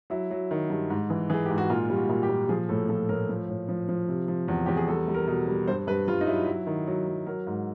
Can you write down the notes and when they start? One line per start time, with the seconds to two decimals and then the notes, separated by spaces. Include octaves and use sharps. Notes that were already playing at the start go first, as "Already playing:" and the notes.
0.10 F#3 E4
0.31 F#3
0.51 D#3
0.70 G2
0.90 G#2
1.10 E3
1.30 E3 G#4
1.46 G#2 G4
1.58 F#4
1.70 A#2 F4
1.90 G3
1.96 F#4
2.09 A#2
2.23 G4
2.29 A#2
2.49 F3 G#4
2.69 A2 A4
2.89 F3 A4
3.09 A2 A#4
3.29 F3
3.49 A2
3.69 F3
3.89 F3
4.08 C3
4.28 F3
4.48 E2
4.66 E2 G4
4.77 G#4
4.88 G3 A4
5.08 G3
5.14 A#4
5.27 B2
5.48 G3
5.67 G2 C5
5.87 G2 B4
6.08 G2 F4
6.21 D#4
6.27 F#3 E4
6.47 F#3
6.67 D#3
6.87 F#3
7.07 F#3
7.26 F#3 A#4
7.47 G#2